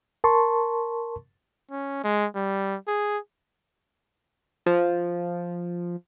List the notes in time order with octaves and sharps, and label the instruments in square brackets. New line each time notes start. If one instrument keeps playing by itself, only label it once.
[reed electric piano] A#4 A5 C6 C#6
[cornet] C#4
G#3
G3
G#4
[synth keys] F3